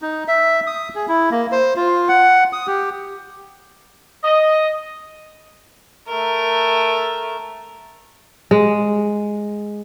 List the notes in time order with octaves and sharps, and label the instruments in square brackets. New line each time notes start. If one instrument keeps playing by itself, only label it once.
[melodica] D#4
E5
D#6
G#4
E4
A#3
C5
F4
F#5
D#6
G4
[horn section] D#5
[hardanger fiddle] A3 A#4
[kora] G#3